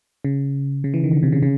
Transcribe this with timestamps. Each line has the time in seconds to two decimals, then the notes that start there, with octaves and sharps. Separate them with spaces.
0.25 C#3
0.84 C#3
0.94 E3
1.04 D#3
1.13 D3
1.23 C3
1.32 C#3
1.43 C#3